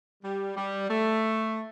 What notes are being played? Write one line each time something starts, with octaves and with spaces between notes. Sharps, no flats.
G3
G3
A3